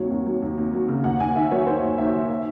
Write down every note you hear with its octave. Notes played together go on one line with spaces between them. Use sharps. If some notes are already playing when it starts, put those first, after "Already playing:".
Already playing: D#2 C3 F#3 C#5
D#2
F#3
D#2
D#2
F#3
C#3
D#2 F#5
D#2 G#5
D#3 E5
F#3 C#5
D#3 C5
D#2
D#2 E5
D#3
E5